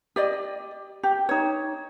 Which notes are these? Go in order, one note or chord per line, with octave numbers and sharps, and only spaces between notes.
G4 D5 D#5
G4
D#4 C#5